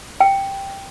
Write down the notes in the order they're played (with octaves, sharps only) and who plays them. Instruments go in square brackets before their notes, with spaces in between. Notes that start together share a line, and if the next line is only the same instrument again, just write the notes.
[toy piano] G5